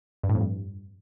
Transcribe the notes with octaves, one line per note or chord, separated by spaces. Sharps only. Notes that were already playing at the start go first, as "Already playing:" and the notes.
G2
A2
F2
G2